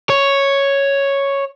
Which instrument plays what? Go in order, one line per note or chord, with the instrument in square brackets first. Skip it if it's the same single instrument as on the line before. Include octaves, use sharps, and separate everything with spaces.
[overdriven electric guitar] C#5